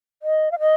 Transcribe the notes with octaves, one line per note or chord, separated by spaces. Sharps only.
D#5
F5
D#5